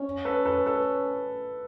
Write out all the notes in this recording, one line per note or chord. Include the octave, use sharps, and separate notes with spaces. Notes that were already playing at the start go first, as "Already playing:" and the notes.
Already playing: C#4
A4 B4
A4 B4
A4 B4